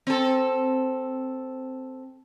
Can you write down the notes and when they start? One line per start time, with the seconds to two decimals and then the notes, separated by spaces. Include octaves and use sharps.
0.07 C4 A4